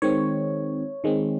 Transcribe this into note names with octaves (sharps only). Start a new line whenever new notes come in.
D#3 G#3 C4 C#5
D#3 G#3 C4